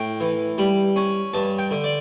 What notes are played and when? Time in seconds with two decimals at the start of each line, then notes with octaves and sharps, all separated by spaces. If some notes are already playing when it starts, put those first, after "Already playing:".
Already playing: A2 G5
0.20 E3
0.58 G3
0.96 C#4
1.34 G2 A5
1.59 G5
1.71 D3
1.84 D5